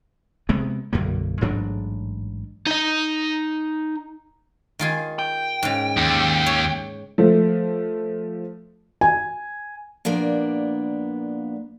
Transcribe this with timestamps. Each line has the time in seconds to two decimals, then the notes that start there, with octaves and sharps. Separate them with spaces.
0.49 C3 G#3 B3
0.93 B1 F#2 D3 A#3
1.41 A1 G#2 F#3 D4
2.67 D#4 D#5
4.79 D#3 F4 G#4
5.19 G5
5.63 G#2 C#3
5.97 D#2
6.46 C#5
7.18 F3 A3
9.01 G#5
10.05 A#2 F3 A#3 B3 D4